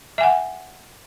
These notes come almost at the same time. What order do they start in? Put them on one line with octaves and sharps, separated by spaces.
E5 G#5 F#5